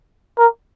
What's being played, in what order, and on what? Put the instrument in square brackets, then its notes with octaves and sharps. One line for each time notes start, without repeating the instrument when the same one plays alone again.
[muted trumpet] A#4